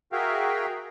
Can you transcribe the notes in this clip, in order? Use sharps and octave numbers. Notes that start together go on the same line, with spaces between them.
F#4 G#4 A#4 E5 F5 G5